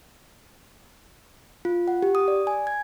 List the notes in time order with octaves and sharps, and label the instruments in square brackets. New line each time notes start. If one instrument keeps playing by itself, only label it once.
[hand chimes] F4
F#5
G4
D#6
D5
G#5
G#6